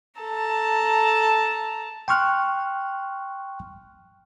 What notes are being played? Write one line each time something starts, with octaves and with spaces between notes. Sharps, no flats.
A4 A5 A#5
G5 C6 C#6 F6 F#6